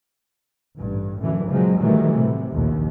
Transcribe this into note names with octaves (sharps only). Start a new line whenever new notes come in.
A1 G2
F#2 A2 D3 E3 F#3
A#2 C#3 F3 F#3 G#3
A#2 D#3 E3 F#3 G3 A3
A2 C3
A#1 D#2